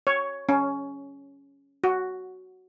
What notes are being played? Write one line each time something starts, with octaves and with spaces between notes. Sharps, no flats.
C#5
C#4
F#4